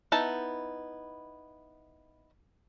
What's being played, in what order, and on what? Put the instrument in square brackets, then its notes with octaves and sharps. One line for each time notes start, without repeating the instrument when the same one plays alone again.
[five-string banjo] B3 D#4 E4 A5